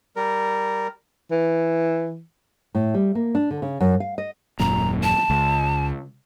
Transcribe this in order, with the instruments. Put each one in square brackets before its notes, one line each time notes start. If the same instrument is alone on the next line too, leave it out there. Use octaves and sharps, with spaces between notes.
[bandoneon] G3 A#4
[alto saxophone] E3
[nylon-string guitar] A2
G3
A#3
D4
D3
C#3
F#2
F5
D#5
[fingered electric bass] D#1 F#2 A#2 [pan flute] A#5
[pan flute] A5
[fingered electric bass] C#2